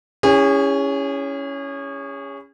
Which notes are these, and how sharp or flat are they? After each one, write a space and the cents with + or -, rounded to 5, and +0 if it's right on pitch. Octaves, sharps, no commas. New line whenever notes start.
C#4 +10 E4 +0 G#4 -35